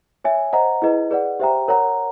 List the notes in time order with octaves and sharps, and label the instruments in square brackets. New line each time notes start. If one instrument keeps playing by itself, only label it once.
[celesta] C#5 E5 G#5
C5 D#5 F#5 A#5
E4 G#4 B4 D#5
G#4 B4 D5 F#5
G4 C5 E5 G5 A#5
A#4 C#5 F#5 A#5